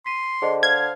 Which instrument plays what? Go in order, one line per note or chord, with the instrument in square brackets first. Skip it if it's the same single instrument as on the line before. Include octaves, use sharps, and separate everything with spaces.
[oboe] C6 [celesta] B6 D#7
[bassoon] D3 [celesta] G#4 C5 D#5
[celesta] C5 [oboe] F5 [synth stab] G#6